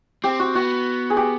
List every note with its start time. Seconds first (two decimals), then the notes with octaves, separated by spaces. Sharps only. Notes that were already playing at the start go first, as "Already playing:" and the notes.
0.24 C4 G4
0.40 F#4
0.55 B3 F#4
1.10 G#4
1.17 G4